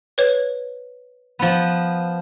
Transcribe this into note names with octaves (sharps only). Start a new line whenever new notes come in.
B4 C#5
F3 B3